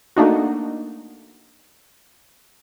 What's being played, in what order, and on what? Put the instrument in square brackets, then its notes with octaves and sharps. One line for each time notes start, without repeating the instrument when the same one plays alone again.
[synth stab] A3 A#3 D4 D#4 F#4